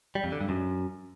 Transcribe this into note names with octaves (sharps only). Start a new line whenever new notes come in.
G3
F2
D3
G2
F#2